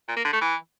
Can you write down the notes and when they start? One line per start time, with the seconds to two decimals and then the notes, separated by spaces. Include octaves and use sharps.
0.08 A#2
0.16 A#3
0.25 D3
0.33 A3
0.41 E3